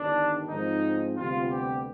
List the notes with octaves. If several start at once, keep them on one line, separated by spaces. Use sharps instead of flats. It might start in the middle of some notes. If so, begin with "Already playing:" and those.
Already playing: G1 G2 D#3 D4
G#2 F3 C4 D#4
D2 C3 G3 B3 F4
G4